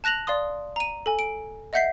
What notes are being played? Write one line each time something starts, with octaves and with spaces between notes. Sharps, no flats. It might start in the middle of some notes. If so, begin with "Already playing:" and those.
A5 F#6 A#6 F7 F#7
D5 F5 C6 D#6
A#5 D#7
A4 G#5
D7
D#5 E5 F#5 G6 B6 C7